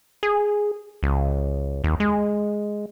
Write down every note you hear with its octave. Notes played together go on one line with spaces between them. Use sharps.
G#4
C#2
D#2
G#3